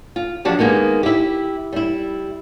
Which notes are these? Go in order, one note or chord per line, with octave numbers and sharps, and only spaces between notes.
F4
F3 F#3 D4 F#4 G4
D#3 G#3 A#3 B3 D#4
E4 G4
G3 E4